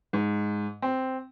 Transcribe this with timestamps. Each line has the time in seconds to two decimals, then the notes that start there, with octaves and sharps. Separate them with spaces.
0.13 G#2
0.82 C4